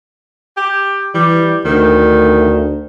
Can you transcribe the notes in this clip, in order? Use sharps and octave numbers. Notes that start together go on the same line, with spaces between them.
G4
E3 G3
D2 D#3